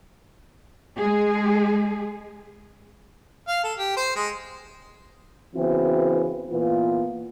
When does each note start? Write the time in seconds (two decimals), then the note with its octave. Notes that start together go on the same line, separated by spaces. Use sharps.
0.97 G#3 G#4
3.48 F5
3.64 A4
3.78 G4
3.97 C5
4.16 G#3
5.55 C#3 E3 B3 C4 E4 F#4
6.51 A#2 E3 A#3 B3 F4